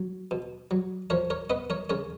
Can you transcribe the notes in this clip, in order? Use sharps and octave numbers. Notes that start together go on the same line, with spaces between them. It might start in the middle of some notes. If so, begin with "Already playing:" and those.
Already playing: F#3
B2
F#3
F3 A#4 C#5
A#4 C#5
B3 B4 D#5
A#4 C#5
C#3 A#4 C#5